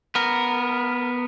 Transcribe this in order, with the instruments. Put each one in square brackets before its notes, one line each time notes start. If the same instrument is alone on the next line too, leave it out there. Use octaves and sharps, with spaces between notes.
[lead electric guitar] B3 A#4